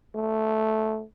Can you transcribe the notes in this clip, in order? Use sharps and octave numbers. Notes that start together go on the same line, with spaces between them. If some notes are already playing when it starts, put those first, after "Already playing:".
A3